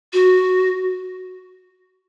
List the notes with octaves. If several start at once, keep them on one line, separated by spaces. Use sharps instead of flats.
F#4